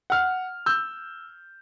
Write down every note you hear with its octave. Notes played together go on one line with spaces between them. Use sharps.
F#5 F6
E6 G6